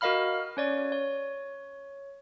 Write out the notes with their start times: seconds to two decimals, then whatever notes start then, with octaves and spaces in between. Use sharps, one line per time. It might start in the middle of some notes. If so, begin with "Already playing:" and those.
0.01 F#4 A#4 D#5 F5 B5 F6
0.57 C#4 C#5 D5
0.92 C#5